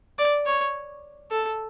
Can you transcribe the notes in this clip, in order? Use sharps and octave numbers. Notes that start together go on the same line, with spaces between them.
D5
C#5
A4